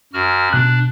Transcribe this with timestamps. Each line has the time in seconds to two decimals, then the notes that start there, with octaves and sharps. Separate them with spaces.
0.13 F#2 F#4 F6
0.53 B2 D4 F#6